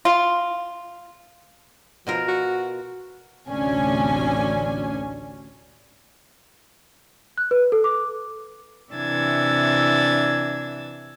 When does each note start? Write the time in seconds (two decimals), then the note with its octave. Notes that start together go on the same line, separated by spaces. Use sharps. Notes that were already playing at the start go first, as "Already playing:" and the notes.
0.05 F4
2.07 B2 F3 F4 A#4
2.28 F#4
3.47 A1 D2 C3 C#4 D4 G#5
7.38 F#6
7.51 B4
7.72 A4
7.84 D6
8.93 C3 E3 D4 E6 G#6 A6